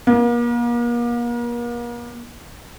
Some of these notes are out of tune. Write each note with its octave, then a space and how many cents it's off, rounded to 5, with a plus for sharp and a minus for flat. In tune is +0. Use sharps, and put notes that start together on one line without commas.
A#3 +40